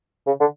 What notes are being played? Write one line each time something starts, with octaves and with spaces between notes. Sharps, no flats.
C#3
D3